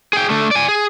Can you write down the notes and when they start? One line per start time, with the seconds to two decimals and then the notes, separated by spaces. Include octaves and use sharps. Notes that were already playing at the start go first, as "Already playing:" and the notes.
0.13 G#4 G5
0.30 D3 A3
0.51 D5 G#5
0.68 G#4